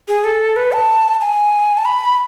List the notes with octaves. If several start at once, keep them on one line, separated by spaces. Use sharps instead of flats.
G#4
A4
B4
A5
G#5
A5
B5